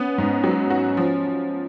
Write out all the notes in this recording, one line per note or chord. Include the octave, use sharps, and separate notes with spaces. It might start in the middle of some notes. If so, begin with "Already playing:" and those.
Already playing: B3 C#4
G#2
F#3
F#4
F3